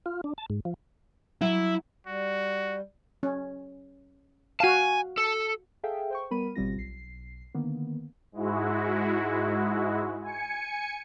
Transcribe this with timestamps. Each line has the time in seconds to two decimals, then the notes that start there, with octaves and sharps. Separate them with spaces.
0.06 F4
0.24 D4
0.38 A5
0.50 G#2
0.65 F3
1.42 F#3 E4
2.07 G3 F#4
3.23 C#4
4.60 F#4 F5 G#5 A5
5.18 A4
5.83 G#4 A4 E5 F5 G5
6.10 C5 G5 C#6
6.31 G3 B3 A#4 B5 D#7
6.55 G#1 B2 G3 C4 F4 A#6
6.76 B1 C7
7.55 D3 D#3 A#3 B3
8.32 G#2 G#3 E4 F#4
10.22 G#5 C#7